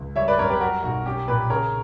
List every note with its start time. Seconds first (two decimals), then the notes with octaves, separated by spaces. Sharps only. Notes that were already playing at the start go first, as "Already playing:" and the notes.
Already playing: C#2
0.16 G3 C#5 E5
0.28 B4 D5
0.39 F#2 A#4 C#5
0.49 G4 B4
0.60 G3 F#4 A#4
0.83 B1 F#4
1.06 C#4 G4
1.28 A#2 G4 B4
1.50 C#3 A#4 C#5